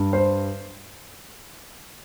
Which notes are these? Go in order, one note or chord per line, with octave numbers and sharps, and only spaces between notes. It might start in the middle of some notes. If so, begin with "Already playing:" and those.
Already playing: G2
C5